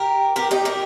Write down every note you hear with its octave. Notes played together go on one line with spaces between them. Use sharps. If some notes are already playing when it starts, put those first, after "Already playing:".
Already playing: G4 A#4
G4 A#4
D#4 G4
G4 A#4